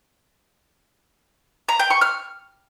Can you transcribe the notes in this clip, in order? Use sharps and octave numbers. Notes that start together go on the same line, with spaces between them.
A#5
G5
C#6
F6